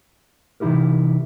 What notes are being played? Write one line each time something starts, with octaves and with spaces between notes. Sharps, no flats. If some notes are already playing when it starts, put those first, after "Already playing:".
C3 E3 D#4 E4 G4 A#4